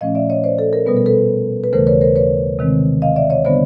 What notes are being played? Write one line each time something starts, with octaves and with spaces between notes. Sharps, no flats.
A#2 F3 A3 C#4 D#5 F5
D5 E5
C#5 D#5
C5 D5
A4
A#4
B2 G3 B3 B4
A#4
A4 B4
B4
D#2 C#3 E3 A3 A#4 C5
B4 C#5
A#4 C5
B4 C#5
C3 D#3 G#3 C4
D#5 F5
D5 E5
C#5 D#5
D3 G3 B3 D4 C5 D5